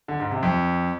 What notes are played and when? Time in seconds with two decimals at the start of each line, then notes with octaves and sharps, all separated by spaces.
0.08 D3
0.20 G#2
0.31 C3
0.43 F2